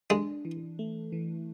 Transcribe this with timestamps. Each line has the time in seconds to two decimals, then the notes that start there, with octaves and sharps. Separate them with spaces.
0.10 G#3 D4
0.45 E3
0.79 A3
1.12 E3